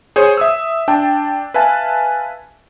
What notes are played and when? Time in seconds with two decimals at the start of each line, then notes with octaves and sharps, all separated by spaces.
0.16 G#4 C5 C#5
0.37 E5 D#6 E6
0.88 D4 G5 A5
1.54 B4 E5 F5 G#5 A5